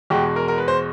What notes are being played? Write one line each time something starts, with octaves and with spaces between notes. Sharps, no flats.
E2 B2 G#3 G4
A#4
A#4
B4
C5